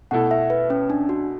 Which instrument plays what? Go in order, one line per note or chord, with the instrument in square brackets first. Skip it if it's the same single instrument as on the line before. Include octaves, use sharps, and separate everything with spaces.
[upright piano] B2 A3 E4 A4 [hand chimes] F#5
[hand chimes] E5
B4
C#4
D4
F#4